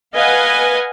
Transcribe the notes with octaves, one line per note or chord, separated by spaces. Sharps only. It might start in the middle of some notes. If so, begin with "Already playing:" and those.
B4 D#5 F5 F#5 G#5